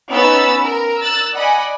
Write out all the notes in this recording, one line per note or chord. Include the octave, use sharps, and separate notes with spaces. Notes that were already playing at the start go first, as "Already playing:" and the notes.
B3 C#4 D#4 B5 E6 A6
A#4
E6 F#6 A6
D5 D#5 F#5 G#5 B5